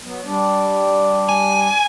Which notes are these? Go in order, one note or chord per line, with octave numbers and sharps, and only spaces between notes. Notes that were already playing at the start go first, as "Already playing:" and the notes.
F#3 B3
G3 D4 D5
G#5